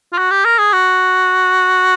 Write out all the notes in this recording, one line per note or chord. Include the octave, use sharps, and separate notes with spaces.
F4
F#4
G4
A#4
G#4
F#4